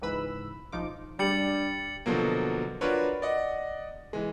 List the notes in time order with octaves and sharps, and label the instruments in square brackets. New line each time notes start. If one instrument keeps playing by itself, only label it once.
[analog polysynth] C#2 G#2 E3 B4 B5 E6
A#1 F3 D#4 F4 D6
[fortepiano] G3 [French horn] D4 [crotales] A6 C#7 F#7
[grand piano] B2 D3 F3 F#3 A#3
D4 F4 F#4 A#4 B4 C#5
D5 D#5 F#5
E3 G#3